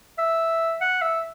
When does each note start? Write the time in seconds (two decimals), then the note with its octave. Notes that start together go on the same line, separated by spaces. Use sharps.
0.18 E5
0.81 F#5
1.02 E5